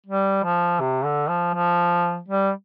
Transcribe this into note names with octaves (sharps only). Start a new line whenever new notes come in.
G3
F3
C3
D3
F3
F3
G3